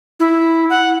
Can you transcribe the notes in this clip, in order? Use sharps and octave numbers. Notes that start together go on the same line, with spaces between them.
E4
F#5